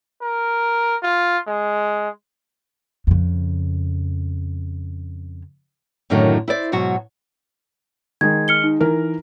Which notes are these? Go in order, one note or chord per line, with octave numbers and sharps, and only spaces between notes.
A#4
F4
G#3
F2 C#3
F#2 A2 D3 D#3 F#3
E4 C5 D5
G#2 B2 F#3 F#4
D#3 G#3 G#6
F6 C#7 G7
D#4
E3 A#4